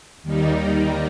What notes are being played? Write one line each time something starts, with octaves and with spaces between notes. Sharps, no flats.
D#2 D#3 G3 D#4